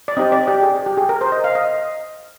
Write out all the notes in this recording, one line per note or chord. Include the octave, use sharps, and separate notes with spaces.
D5
C4 D#4 G4 D#5
D5
G4
G#4
G4
G#4
A#4
C5
D#5
F5
D#5